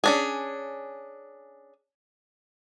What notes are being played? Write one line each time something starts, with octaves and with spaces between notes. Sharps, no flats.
C#4 D4 G#4